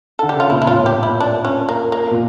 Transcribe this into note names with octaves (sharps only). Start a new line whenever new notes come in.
D3 A4
G4
C#3 F4
A#2 E4
E4
A#2 F4
A2
G4
A2
E4
D4
C#4
A#3
A#3
A#2